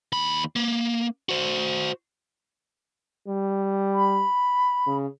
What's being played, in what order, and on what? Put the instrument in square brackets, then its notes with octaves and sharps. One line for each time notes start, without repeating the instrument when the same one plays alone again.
[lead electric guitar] D#2 B5
A#3
F#4 C5
[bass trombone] G3
[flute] B5
[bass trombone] C#3